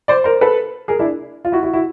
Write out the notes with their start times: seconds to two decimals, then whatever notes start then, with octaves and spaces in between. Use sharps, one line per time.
0.08 C5 D5
0.24 A#4 C5
0.41 A4 B4
0.88 G#4 A#4
0.99 D4 E4
1.45 F4
1.52 E4 F#4
1.63 E4 F#4
1.73 E4 F#4